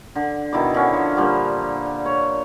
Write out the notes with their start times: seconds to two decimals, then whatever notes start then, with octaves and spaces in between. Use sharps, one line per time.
0.16 D3
0.53 B2 D#3 E4 D6
0.74 D3 C#4
0.93 F3
1.17 A#2 D3 F3 G3
2.06 C#5